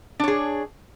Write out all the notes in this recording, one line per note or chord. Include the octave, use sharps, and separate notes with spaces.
D4 G#4 C#5